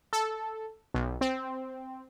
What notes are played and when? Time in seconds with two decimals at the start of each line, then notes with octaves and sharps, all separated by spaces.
0.13 A4
0.94 B1
1.21 C4